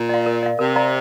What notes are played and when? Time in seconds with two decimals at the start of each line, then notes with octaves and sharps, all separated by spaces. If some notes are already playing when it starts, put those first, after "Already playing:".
Already playing: A#2
0.09 D5 F5
0.26 A#4
0.43 D5 F5
0.59 C3 A#4
0.76 D5 F5 A#5